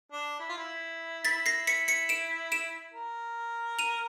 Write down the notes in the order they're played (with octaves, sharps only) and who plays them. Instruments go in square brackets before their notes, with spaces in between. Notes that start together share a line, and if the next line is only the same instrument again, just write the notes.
[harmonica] D4
E4
F4
E4
[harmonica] E4 [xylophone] A6 B6
[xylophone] A#6 C7
B6 C#7
B6 C#7
D7 E7
D7 E7
[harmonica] A#4
[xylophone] D#7 F7